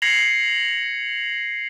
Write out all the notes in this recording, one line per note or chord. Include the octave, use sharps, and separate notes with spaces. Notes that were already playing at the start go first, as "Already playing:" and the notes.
G#6 A#6 C7 C#7 F7 F#7